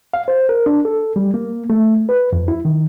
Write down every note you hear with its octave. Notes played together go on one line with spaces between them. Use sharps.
F5
C5
A#4
D4
A4
G3
A#3
A3
B4
F2
E4
D#3